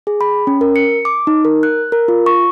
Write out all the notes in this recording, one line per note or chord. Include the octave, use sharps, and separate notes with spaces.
G#4
B5
C#4
A#4
C#7
D6
D#4
A#4
F#6
A#4
F4
C#6